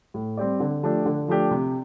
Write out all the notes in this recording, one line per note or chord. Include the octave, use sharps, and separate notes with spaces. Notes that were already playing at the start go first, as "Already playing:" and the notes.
A2
G3 C4 G4 D5
D3
F3 A3 D4 G4
D3
F3 A3 D4 G4
C3